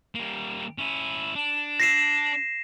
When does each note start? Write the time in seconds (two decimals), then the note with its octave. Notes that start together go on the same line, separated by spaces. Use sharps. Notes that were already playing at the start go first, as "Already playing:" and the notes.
0.15 G3 A#3
0.78 C#4 E4
1.35 D4
1.80 A#6 C7 E7